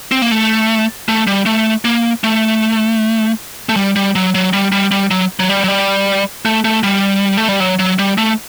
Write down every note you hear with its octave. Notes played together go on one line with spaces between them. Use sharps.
C4
A#3
A3
A3
G3
A3
A#3
A3
A3
G3
G3
F#3
F#3
G3
G3
G3
F#3
F#3
G3
F#3
G3
A3
A3
G3
A3
G3
F#3
F#3
G3
A3